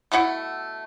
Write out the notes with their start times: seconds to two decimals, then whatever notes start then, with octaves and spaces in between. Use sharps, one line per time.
0.12 B2 A3 E4 F#5